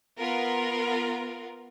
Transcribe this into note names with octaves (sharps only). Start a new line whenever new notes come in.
B3 F4 A#4